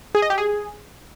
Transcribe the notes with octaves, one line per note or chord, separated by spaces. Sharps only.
G#4
D#5
G4
G#4